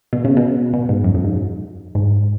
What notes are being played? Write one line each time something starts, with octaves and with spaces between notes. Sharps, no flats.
B2
C#3
B2
B2
G#2
F#2
F#2
G#2
G#2